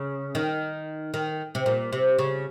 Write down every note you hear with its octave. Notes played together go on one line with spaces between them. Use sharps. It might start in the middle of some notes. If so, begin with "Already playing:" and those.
Already playing: C#3
D#3
D#3
C3
A#2
C3
C#3